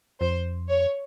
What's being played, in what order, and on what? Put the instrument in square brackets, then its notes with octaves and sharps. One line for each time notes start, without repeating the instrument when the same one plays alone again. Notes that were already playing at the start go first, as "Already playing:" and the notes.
[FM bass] F2 [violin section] C5
[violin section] C#5